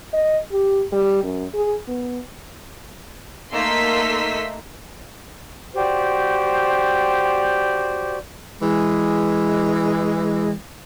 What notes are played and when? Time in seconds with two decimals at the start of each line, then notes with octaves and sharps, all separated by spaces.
0.13 D#5
0.52 G4
0.92 G3
1.23 F#2
1.55 G#4
1.88 B3
3.52 A3 A#3 D#4 C6 E6 B6
5.73 F#4 G4 C5 D5
8.61 E3 G#3